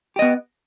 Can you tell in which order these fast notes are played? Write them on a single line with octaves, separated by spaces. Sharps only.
G4 D#5 B3